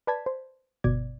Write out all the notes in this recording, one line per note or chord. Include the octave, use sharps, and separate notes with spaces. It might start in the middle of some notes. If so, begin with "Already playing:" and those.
B4 D5 A5 G#6 B6
C5
G1 B2 D5 G#6